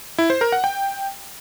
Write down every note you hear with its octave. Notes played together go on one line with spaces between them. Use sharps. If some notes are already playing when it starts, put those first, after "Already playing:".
E4
C5
A#4
F#5
G5